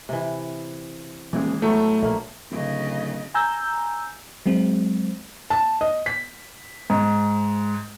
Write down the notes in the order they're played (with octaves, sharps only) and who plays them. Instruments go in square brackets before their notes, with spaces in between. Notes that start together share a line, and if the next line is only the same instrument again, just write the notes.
[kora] C3 E3
[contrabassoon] D#1 [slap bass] E3 F3 G#3 [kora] D5
[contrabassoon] A2 [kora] F#3 B3 [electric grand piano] A3
[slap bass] A#1 [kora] A3 A#3
[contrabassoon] D1 [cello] C#3 D#5
[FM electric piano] G#5 A#5 E6 G6
F#3 G#3 C4
[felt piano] A5
D#5
B6
G#2